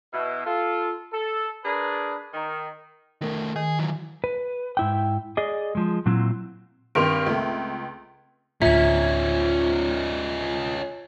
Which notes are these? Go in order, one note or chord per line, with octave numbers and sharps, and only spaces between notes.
B2 E4
F4 A4
A4
D4 G#4 A#4 B4
D#3
D#3 A3 A#4
D#3 G#4
E3 F#3
B4
G#2 E4 G5
G#4 D5 D#5
F3 G#3
A#2 F#3 C4 E4
G2 D#3 C4 C6 D7 F7
C#2 A3
D2 A2 C#4 D#4 F4 E5 G#6